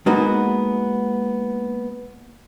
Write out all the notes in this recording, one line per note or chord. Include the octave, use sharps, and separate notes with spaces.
G#3 A#3 B3 D#4 F#4